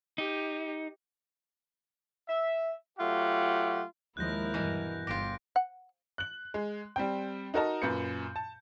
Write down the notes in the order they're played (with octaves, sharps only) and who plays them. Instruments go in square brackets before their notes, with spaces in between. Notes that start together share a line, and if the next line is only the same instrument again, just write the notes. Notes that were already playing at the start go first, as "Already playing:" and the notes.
[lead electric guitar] D#4 [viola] G4
[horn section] E5
F#3 A3 F4 G4 F#5
[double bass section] D#2 F3 G#3 [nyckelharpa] E4 A#4 [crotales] F#6 G6 A#6
[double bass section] G2 [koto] B2 E3
[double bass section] G1 [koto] F4 G4 [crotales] A#6 D7
[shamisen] F#5
[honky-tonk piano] F#6 F#7
G#3
G3 C4 G5
D#4 F#4 A#4 D#5 A5 A#5
F#2 A#2 B4 G6 C#7
A5